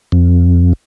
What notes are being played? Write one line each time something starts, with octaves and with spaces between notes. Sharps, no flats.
F2